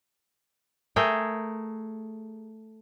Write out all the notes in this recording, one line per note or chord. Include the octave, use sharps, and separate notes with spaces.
A3 G#4 A#4 G5